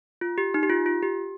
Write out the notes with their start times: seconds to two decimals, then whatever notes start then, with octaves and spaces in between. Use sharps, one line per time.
0.21 F4
0.38 G4
0.54 D#4
0.63 G4
0.70 F4
0.86 F4
1.03 G4